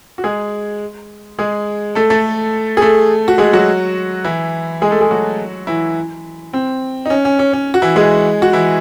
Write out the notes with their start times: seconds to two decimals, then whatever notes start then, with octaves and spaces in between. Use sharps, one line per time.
0.18 F#4
0.24 G#3 G#4
1.39 G#3 G#4
1.95 A3 A4
2.10 A3 A4
2.77 G#4
2.81 A3 A4
3.28 F#4
3.38 G#3 G#4
3.53 F#3 F#4
4.24 E3 E4
4.82 G#3 G#4
4.91 A3 A4
5.01 G#3 G#4
5.11 F#3 F#4
5.67 E3 E4
6.53 C4
7.06 D#4
7.10 C#4
7.25 C#4
7.39 C#4
7.53 C#4
7.74 F#4
7.82 E3 E4
7.96 G#3 G#4
8.42 F#4
8.53 E3 E4